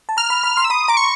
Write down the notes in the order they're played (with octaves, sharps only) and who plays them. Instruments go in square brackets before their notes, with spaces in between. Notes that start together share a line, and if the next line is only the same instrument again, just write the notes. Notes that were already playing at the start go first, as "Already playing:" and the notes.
[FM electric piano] A5
[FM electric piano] A#5 [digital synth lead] F6
[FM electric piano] B5
B5
C6
[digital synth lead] E6
[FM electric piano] B5 [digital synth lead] D#6
[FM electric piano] A#5 [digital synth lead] D6
[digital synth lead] C#6